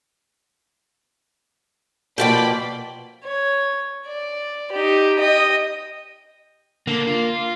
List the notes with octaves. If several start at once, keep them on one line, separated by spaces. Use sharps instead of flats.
B2 F3 A#3 D5 G5 B5
C#5
D5
D#4 G4
D#5 G5
D3 A#3
F4